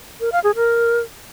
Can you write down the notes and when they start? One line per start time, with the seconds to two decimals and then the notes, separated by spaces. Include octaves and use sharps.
0.21 A#4
0.32 F5
0.44 G#4
0.56 A#4